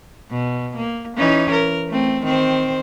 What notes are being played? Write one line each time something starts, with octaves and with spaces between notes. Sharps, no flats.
B2
A#3
E3 C#4 D#4
A#4
A3 C4
D#3 C4 C5